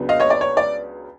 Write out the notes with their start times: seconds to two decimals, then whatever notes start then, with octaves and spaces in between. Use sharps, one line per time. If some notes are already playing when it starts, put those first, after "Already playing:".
Already playing: C#2 C#3 F#3 B3 D4
0.09 D#5 F5
0.20 C#5 D#5
0.30 D5
0.41 C#5
0.57 D5